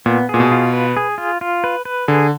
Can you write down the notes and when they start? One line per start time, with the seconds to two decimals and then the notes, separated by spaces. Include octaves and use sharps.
0.06 A#2 B3
0.29 A#2 G#4
0.40 B2
0.52 F4
0.73 B4
0.97 G#4
1.18 F4
1.41 F4
1.64 B4
1.85 B4
2.08 D3 G#4